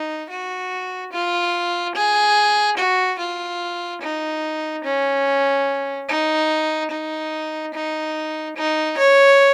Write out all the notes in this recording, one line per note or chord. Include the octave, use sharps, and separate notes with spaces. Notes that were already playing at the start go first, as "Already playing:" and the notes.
Already playing: D#4
F#4
F4
G#4
F#4
F4
D#4
C#4
D#4
D#4
D#4
D#4
C#5